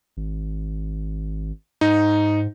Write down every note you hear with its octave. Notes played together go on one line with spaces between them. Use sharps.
G#1
G#2 D#4